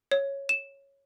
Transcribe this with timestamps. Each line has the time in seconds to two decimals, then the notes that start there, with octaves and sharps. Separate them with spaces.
0.12 C#5
0.49 E7